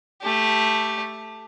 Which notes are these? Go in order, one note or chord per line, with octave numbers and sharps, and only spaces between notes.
A3 G4